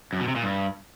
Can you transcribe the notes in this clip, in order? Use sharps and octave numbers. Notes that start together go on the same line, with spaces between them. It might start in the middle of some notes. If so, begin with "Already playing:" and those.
F#2
B2
C3
A#2
G2